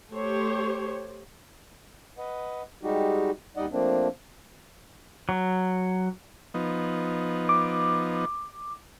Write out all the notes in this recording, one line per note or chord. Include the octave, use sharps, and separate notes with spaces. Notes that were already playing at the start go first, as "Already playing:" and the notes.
A3 G4 C5 C#5
B4 D#5 F#5
G3 G#3 D#4 F#4 G4
D#2 G3 D#4 D5 D#5 F#5
F3 A3 A#3 C4 D4
F#3
F3 B3 D#4
D6